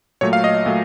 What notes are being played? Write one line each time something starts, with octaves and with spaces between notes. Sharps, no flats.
A#2 F#3 A3 C#5
F5
D#5
A#2 F#3 A3